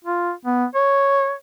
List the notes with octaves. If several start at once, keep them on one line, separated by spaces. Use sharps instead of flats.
F4
B3
C#5